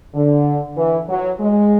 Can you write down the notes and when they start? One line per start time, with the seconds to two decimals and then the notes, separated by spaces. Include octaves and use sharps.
0.14 D3
0.77 E3
1.09 F#3
1.40 G#3